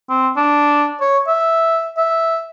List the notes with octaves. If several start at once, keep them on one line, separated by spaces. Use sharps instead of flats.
C4
D4
C#5
E5
E5